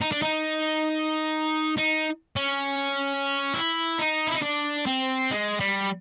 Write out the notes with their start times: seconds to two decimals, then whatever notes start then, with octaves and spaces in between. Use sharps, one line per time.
0.01 D#4
0.12 D4
0.22 D#4
1.78 D#4
2.36 C#4
3.54 E4
3.98 D#4
4.27 E4
4.34 D#4
4.42 D4
4.86 C4
5.31 G#3
5.60 G3